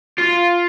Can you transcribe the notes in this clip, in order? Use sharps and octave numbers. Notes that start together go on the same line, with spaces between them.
F4